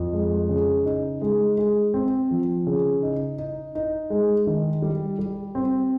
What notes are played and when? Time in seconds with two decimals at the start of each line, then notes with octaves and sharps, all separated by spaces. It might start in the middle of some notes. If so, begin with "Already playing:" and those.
Already playing: F2
0.13 G#3
0.49 C#3
0.85 D#4
1.21 G#3
1.58 G#3
1.94 C4
2.31 F3
2.67 C#3
3.03 D#4
3.38 D#4
3.75 D#4
4.10 G#3
4.47 D#3
4.82 G3
5.19 G3
5.55 C4